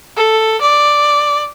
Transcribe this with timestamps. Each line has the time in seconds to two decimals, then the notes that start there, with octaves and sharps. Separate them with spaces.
0.16 A4
0.61 D5